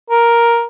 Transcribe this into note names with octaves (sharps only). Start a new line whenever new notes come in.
A#4